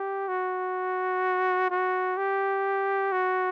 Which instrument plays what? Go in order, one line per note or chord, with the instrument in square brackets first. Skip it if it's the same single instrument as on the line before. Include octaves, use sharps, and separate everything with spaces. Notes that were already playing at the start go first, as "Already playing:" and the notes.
Already playing: [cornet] G4
F#4
F#4
G4
F#4